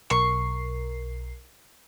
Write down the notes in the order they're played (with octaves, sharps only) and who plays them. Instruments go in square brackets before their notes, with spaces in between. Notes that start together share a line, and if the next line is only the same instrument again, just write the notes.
[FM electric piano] B1 A#4 C7 [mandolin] C#6